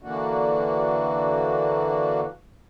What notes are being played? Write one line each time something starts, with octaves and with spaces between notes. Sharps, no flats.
D3 E3 A#3 D4 F#4